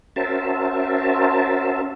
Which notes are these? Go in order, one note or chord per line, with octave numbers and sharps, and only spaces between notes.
C#4 F#4 A#4 C5 E5 A5